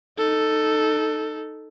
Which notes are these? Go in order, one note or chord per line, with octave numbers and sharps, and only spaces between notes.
D#4 A4